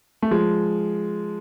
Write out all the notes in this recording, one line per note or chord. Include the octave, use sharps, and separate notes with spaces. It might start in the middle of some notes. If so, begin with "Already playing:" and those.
A3
F3 G#3